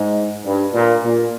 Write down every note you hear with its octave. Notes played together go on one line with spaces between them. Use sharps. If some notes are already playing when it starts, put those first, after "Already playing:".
Already playing: G#2
G2
A#2
A#2